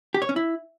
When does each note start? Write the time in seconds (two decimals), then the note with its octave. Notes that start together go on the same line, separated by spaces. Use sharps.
0.14 G4
0.22 C#5
0.29 C#4
0.36 E4